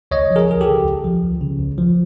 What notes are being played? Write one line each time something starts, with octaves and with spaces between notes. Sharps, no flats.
C#2 C#5 D#5
F3
G#4 A#4
C#2 G#4
G4 A4
C#3
C#2
F3
C#2
C#3
C#2
F3